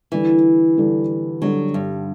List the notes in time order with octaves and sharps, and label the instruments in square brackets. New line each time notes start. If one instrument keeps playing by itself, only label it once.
[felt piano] D3 G3 D4 A4 [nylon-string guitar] E3
[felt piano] D3 G3 D4 A4
[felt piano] D3 G3 D4 A4 [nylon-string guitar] F#3
[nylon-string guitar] G2